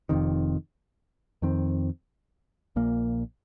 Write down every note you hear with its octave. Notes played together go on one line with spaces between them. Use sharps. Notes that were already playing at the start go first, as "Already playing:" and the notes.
F1 F2 C3 D#3
F2 D#3 C4
A#1 A#2 A#3